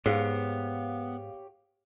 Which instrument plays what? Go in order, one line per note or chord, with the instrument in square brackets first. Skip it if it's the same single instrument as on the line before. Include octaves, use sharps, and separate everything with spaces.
[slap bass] G#2 [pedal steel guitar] B3 [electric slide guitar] G4 C#5 [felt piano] G#4 F5